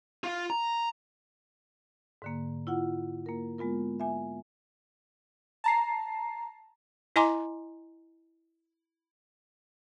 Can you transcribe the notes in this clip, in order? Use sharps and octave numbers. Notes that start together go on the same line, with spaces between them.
F4
A#5
G#2 D3 A#3
E4 F4 F#5
A#3 A#4
G#3 B3 F4 A#4
E5 G#5
A5 A#5 C7
E4 D#5 G#5 A#5 C6 D6